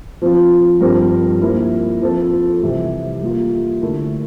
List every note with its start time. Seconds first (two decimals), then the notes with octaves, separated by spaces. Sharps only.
0.22 F3 C4 F4
0.81 G2 F3 C4 G4 A#4
1.41 F3 A#3 E4 A#4
2.01 F3 C4 F4 A4 C5
2.62 C3 E3 G3
3.22 G3 A#3 F4
3.82 D3 A3 E4 A#4